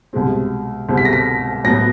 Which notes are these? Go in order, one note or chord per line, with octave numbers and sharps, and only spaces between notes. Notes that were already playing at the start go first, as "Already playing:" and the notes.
C2 B2 G#3 C4
C2 B2 G#3 C4
B6
A#6
B6
A2 F#3 B3 A#6